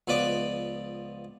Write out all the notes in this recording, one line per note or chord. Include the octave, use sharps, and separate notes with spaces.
C#2 F3 B3 B4 D5 D6